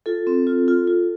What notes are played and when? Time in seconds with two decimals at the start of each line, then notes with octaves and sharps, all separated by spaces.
0.06 F4 A4
0.27 C4
0.47 F4
0.68 F4
0.87 F4